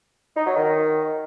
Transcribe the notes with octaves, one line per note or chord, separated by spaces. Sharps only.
D#4
F#3
D#3